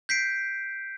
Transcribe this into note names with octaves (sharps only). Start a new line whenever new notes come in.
G6 B6 C7 D7